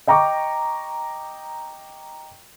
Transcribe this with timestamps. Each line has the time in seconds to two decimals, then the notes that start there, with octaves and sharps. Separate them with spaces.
0.07 D#5 G5 A#5 C#6 D6